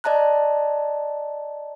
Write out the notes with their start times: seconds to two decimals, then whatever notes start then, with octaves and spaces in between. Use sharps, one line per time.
0.04 D5 D#5 A5 A#5 F#6